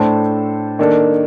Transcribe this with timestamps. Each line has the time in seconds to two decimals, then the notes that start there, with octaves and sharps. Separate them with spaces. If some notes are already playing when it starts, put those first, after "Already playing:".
Already playing: A2 A3 D4 A4 C5
0.79 D#3 A#3 D4 A4